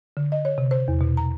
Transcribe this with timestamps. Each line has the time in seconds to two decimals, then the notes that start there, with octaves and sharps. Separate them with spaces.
0.17 D3
0.32 D#5
0.45 C#5
0.58 C3
0.71 C5
0.88 E2
1.01 B2
1.17 A#5